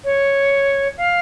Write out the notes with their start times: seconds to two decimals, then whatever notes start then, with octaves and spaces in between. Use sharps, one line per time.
0.04 C#5
0.97 F5